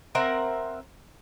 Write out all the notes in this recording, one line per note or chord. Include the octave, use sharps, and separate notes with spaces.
C4 A#4 E5 F#5